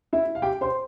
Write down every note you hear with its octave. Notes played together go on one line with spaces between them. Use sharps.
E4 E5
F5
G4 G5
C5 C6